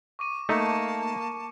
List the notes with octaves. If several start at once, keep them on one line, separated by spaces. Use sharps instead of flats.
C#6 D6 D#7
A3 A#3 D#4 A5 C#7